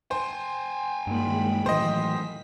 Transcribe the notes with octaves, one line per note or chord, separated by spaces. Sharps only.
C5 G5 G#5
G2 D#3 G#3 A#3 B5
A2 E3 F#3 C5 D#5 B6